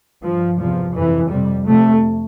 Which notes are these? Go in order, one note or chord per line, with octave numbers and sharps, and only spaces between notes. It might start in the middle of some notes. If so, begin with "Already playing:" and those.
G2 F3
E2 C3 F3
F2 C3 E3
F2 C3 G3
F2 C3 A3